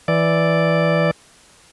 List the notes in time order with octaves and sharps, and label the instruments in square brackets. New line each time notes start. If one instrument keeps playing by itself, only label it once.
[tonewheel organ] E3 D5